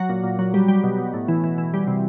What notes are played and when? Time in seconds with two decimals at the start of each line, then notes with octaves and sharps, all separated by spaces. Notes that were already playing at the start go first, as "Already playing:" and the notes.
Already playing: F#3 F#4
0.09 A#2
0.24 A#2
0.39 F#3
0.54 G3
0.68 G3
0.84 B2
0.98 B2
1.14 A2
1.28 E3
1.44 E3
1.58 E3
1.74 G3
1.88 C3